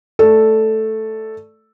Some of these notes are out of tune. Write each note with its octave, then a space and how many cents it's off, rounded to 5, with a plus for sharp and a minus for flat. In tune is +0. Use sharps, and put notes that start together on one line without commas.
A3 +0 A4 +0 D5 +0